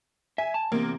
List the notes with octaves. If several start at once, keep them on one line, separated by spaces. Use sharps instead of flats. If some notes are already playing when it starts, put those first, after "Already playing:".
E5 G#5
A5
E2 C3 A#3